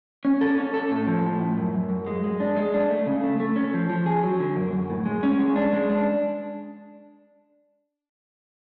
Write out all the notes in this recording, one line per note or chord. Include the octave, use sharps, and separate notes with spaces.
C#4
A4
C#4
A4
A2
F3
A2
A2
F#2
F#2
F#2
G#3
G#3
D4
G#3
D4
A3
C#3
A3
A3
C#4
F3
F3
G#4
F#3
D3
F#2
F#2
A2
G#3
C#4
G#3
D4
G#3
D4